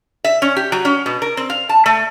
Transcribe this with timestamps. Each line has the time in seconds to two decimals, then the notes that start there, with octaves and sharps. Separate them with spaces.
0.24 E5
0.42 C#4
0.56 G4
0.72 F#3
0.85 C#4
1.06 B2
1.22 A#4
1.37 C4
1.50 F5
1.69 A5
1.86 A3